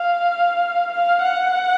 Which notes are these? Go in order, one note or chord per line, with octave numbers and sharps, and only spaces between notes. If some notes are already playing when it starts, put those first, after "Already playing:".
Already playing: F5
F5
F#5